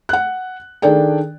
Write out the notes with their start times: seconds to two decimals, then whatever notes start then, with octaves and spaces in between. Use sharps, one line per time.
0.09 F#5 F#6
0.82 D#3 D4 G#4 A4 D5 G5